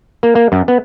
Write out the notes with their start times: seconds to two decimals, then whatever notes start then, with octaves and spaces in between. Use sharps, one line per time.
0.23 A#3
0.35 A#3
0.52 F#2
0.68 B3